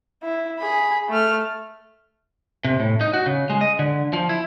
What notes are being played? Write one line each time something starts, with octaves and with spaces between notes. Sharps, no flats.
E4
G#4 B5
A3 F6
C3
A2
D#4
F#4
C#3
G#3
D#5
D3
F3
E4